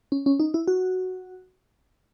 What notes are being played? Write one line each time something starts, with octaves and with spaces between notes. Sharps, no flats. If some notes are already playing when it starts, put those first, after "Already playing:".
C#4
C#4
D#4
E4
F#4